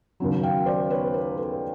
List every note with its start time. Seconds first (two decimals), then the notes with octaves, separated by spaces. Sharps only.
0.20 D#2 C#3 F#3
0.43 F5 G5
0.66 C5 D5
0.90 B4 C#5
1.14 A#4 C5
1.37 A4 B4